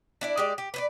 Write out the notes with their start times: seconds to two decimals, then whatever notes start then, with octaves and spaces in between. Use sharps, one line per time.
0.21 D4 E4 D5
0.37 G#3 G4 D5
0.58 G4
0.74 B4 C5 D5